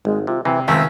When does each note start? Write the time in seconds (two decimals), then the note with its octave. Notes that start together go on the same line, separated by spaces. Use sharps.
0.05 G#1 G#3
0.27 C3 F4
0.45 C3 E3 G5
0.68 C#2 C3 D#3 A3 C4